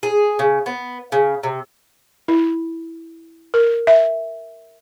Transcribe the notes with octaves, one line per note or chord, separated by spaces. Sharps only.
G#4
C#3
B3
C#3
C3
E4
A#4
E5